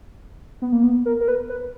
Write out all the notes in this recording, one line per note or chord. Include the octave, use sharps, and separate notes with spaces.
B3
A#3
B3
A#4
A#4
B4
B4